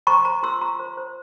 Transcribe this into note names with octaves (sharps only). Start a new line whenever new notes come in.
C5 A#5 C#6
C5 A#5 C#6
F4 C6 E6
F4 A#5 C#6
C5
C5